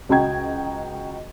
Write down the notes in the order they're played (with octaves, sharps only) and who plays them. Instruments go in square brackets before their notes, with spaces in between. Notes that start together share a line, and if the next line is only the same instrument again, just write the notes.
[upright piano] C#2 F#4 D#5 G5 A#5 G#6